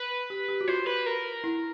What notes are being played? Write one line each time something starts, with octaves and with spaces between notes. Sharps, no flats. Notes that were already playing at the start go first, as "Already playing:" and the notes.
Already playing: B4
G4
G4
F#4
F4 C5
B4
A#4
E4